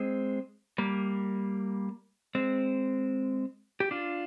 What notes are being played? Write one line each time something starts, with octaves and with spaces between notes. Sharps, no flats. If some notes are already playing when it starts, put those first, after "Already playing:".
Already playing: G#3 C4
G3 A#3
G#3 C4
G4
D4 F4